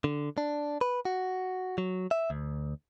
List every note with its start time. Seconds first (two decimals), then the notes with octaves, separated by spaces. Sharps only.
0.04 D3
0.38 D4
0.81 B4
1.05 F#4
1.78 F#3
2.11 E5
2.30 D2